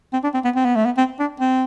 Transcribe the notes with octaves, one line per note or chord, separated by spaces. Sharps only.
C4
D4
C4
B3
C4
B3
A3
B3
C4
D4
C4